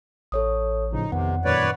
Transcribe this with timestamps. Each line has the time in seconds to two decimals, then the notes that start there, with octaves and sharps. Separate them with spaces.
0.32 A1 A4 C#5 D#6
0.93 A2 C#3 F3 D#4
1.12 F2 C3 D#3 B3 F#5
1.45 F#2 A#2 D#3 B4 C#5 D5